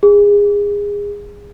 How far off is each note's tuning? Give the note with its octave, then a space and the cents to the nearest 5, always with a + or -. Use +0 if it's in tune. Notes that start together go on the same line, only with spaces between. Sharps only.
G#4 -25